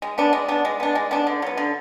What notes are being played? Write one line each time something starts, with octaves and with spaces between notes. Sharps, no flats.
G#3
B3 D4
G#3
B3 D4
G#3
B3 D4
G#3
B3 D4
D3
F#3 B3
D3